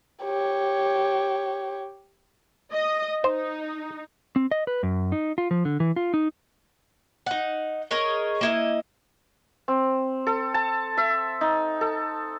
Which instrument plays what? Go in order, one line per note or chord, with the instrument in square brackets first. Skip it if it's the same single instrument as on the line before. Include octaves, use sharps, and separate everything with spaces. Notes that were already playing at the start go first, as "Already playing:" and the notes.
[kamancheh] G4 C#5
[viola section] D#5
[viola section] D#4 [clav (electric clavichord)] C5
[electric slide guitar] C4
D#5
B4
F#2
D#4
F4
F3
D3
E3
F4
D#4
[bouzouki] D#4 F#5
G#4 A#4 C#5 D#5
A#3 E4 D#5
[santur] C4
A4
A5
E5
D#4
A4